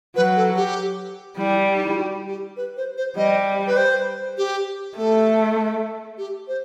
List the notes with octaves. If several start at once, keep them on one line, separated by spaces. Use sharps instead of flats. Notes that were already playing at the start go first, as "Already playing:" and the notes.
F#3 B4
A4
G4
G3 E4
D#4
E4
F#4
G4
B4
C5
C5
G3 D#5
B4
C5
G4
A3 A4
G4
C5